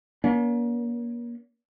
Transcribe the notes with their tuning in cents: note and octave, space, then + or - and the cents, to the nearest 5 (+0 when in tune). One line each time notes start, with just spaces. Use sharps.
A#3 +35 C#4 +45